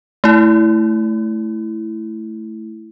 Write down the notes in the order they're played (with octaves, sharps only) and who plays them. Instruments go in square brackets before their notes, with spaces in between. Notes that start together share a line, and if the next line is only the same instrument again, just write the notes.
[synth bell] A3 E4